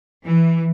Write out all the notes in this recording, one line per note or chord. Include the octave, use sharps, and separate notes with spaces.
E3